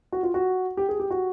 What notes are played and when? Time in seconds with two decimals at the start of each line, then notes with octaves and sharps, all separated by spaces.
0.12 F#4
0.23 F4
0.34 F#4
0.77 G4
0.89 G#4
1.00 G4
1.11 F#4